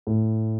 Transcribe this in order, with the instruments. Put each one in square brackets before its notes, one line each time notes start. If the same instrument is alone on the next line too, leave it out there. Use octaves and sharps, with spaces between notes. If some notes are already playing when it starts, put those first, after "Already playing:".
[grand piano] A2